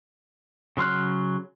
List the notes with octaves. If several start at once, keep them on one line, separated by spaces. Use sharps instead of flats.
C#3 F#3 C6 F6 F#6